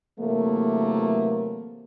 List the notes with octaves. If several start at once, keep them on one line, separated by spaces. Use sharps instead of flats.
C3 E3 F#3 A3 A#3